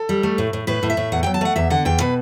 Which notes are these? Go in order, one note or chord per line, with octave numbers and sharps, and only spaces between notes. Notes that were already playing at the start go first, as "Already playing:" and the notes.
Already playing: A4
G3
A3
A2
A2
A2 B4
A2
E5
A2
E2 F#5
F#3 G5
A5
A3 F#5
E2 E5
D3 F#5
E2 G5
B2 B4